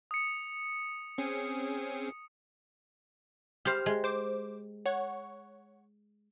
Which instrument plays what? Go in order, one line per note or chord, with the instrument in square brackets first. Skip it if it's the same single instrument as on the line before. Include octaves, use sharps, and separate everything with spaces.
[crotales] D#6 C#7
[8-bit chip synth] C4 C#4 G#4
[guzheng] G4 C5 [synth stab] F6
[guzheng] G#3
[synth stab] C5 D6
C#5 F#5 C#6